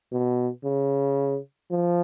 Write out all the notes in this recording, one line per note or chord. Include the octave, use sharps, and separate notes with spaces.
B2
C#3
F3